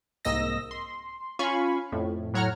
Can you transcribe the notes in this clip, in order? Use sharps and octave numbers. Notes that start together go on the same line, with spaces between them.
C2 G#2 A#3 D#5 E6 A#6
C6
C#4 F4 F5 G#5 B5 C#6
F2 A2
A2 F#3 C#5 F#5 A#5 F6